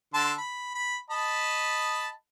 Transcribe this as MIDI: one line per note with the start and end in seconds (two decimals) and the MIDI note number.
0.14 0.33 50
0.14 0.33 81
0.14 0.33 84
0.38 0.72 83
0.75 0.96 83
1.10 2.09 75
1.10 2.09 81
1.10 2.09 83